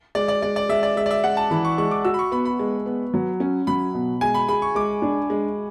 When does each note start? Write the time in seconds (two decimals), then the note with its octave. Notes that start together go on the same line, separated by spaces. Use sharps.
0.15 G#3 D5
0.28 D5
0.42 G#3 D5
0.56 D5
0.69 G#3 E5
0.83 D5
0.96 G#3 E5
1.06 D5
1.11 E5
1.24 G#3 F#5
1.37 A5
1.51 E3 B5
1.65 C#6
1.78 G#3 C#6
1.91 D6
2.05 F#4 E6
2.14 B5
2.19 C#6
2.32 B3 B5
2.45 B5
2.59 G#3
2.86 B3
3.14 F#3
3.40 C#4
3.67 F#3 B5
3.94 B2
4.21 G#3 G#5
4.34 B5
4.48 G#4 B5
4.62 C#6
4.75 G#3 D6
5.02 D4
5.30 G#3